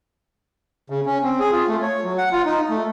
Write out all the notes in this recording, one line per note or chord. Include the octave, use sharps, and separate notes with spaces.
C#3
C#4
C4
G#4
F4
A3
C#5
F#3
F#5
F4
D#4
A3